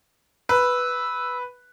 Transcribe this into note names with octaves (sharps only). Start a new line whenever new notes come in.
B4 E6